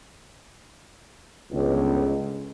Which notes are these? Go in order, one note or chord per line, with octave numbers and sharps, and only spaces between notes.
G1 C#2